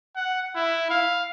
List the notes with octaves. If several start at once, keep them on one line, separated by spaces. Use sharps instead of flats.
F#5
E4
F5